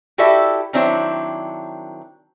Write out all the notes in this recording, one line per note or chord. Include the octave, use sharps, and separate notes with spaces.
E4 F#4 G4 A4 D5 E5
D#3 F#3 C4 D4 E4